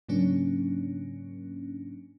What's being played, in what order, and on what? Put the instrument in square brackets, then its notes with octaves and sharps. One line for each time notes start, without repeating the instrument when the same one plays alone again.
[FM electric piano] G#2 C#3 F#3 A#3 C#4 D4